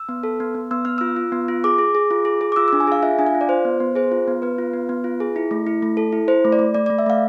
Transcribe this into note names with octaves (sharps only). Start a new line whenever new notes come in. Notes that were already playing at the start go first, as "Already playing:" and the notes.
Already playing: E6
B3
A4
B3
B3
B3 E6
B3 F6
F4 E6
F4
B3
F4
G#4 D6
G#4
G#4
F4
G#4
G#4
D6
F4 E6
D4 E6
G#5
G#4 F5
F4 E5
D4 G#5
F5
F4
D5
F4 C5
B3
B3
G#4 C5
F4
B3
B3 B4
F4
B3
B3
F4
G#4
E4
A3
E4
A3
A4
E4
E4 C5
A3
D5
A3
A3 D5
A3 D5
E5
A3 F5